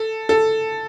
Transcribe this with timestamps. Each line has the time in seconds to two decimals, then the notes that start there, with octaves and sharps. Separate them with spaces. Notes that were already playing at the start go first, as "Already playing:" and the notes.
Already playing: A4
0.29 A4